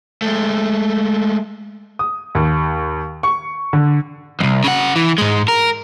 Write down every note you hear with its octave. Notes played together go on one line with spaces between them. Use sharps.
G#3 A3
D#6
D#2
C#6
D3
C2 F2
C#3 F#5
E3
G#2 G#3
A#4